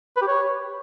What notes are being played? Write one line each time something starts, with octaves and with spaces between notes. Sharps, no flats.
B4
G4
C#5